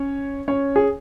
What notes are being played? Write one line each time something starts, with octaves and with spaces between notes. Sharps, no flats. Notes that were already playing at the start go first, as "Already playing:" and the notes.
Already playing: C#4 C#5
C#4 C#5
G#4